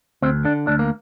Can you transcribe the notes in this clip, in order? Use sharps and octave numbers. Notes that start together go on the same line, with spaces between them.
D2 C4
D3 D4
D2 D4
A#3